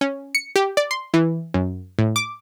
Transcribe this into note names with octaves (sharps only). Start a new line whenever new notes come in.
C#4
C#7
G4
D5
C6
E3
F#2
A2
D6